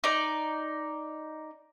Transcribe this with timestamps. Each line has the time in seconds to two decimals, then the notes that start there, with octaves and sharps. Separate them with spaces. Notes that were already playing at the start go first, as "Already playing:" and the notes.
0.04 D#4 D5